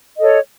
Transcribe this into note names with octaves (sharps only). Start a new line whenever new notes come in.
A4 C#5 D#5